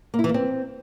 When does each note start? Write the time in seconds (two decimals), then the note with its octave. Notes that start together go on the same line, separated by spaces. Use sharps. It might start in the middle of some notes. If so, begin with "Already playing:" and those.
0.14 A#3
0.19 E4
0.24 E3
0.29 A#3
0.34 C4